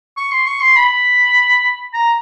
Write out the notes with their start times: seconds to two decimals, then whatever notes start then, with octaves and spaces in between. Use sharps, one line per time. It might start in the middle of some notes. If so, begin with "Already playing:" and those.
0.17 C#6
0.32 C6
0.46 C#6
0.61 C6
0.76 B5
1.93 A#5